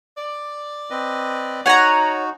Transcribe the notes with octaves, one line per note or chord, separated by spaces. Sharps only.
D5
C4 B4 D#5
D#4 F#4 C#5 F#5 G#5 A#5